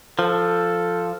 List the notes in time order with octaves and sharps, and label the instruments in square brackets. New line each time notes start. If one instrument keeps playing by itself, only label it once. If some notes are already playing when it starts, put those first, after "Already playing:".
[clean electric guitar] F3 [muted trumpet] A4